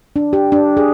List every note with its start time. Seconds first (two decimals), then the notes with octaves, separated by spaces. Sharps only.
0.16 D4
0.33 G4
0.52 D4
0.77 G#4